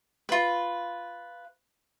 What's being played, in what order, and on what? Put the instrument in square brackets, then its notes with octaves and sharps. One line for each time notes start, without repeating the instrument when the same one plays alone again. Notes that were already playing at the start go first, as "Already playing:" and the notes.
[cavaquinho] F4 B4